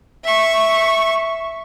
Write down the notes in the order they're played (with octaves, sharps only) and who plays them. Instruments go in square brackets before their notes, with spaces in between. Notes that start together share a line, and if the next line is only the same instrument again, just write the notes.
[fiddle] E5 C#6